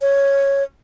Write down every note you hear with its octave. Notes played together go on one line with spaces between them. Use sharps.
C#5